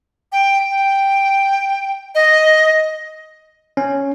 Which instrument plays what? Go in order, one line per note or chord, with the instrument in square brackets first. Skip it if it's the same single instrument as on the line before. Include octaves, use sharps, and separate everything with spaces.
[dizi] G5
G5
D#5
[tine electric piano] C#4